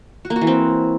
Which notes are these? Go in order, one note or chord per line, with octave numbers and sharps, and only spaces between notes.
F#4
A#3
F#4
E3
C4